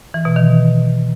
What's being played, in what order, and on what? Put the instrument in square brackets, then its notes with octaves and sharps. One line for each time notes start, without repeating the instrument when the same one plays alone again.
[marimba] E3
B2
D#3